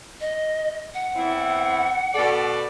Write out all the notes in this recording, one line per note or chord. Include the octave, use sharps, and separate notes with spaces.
D#5
F#5
E2 C4 E4
B2 A4 D5